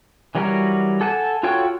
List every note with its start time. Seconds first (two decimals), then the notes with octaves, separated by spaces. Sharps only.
0.35 E3 F#3 G3 F#4 A#4
1.01 A4 F#5 G#5 A5
1.43 F4 F#4 A4 C#5 G5